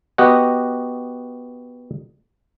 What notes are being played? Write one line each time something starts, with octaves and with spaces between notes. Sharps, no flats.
B3 F#4 G4 D#5 F#5